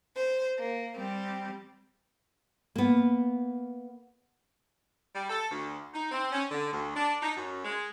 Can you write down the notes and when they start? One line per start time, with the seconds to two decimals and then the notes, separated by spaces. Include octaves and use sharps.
0.15 C5
0.58 A#3
0.95 G3 C4 G4
2.75 A#3 B3
5.15 G3
5.30 A4
5.51 D2
5.94 D#4
6.12 C4
6.32 C#4
6.51 D3
6.73 D2
6.96 D4
7.22 D#4
7.37 F#2
7.64 G#3